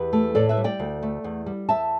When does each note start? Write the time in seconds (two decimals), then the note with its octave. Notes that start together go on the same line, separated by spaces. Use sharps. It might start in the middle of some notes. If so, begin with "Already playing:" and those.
Already playing: E2 G4 B4
0.13 A3
0.35 A2 A4 D5
0.49 B4 E5
0.57 G3
0.64 D5 G5
0.79 D2
1.03 A3
1.24 E2
1.46 G3
1.69 E2 E5 A5